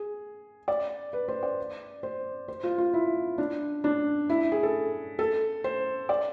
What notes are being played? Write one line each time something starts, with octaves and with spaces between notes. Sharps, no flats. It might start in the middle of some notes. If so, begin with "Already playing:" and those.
Already playing: G#4
D5
B4
C5
D5
C5
C5
F4
F4
E4
D4
D4
E4
G#4
A4
A4
C5
D5